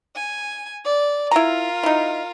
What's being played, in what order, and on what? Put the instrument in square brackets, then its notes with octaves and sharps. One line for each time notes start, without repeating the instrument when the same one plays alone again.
[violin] G#5
D5
[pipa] E4 A#5 [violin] F4 A#4
[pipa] D#4 E4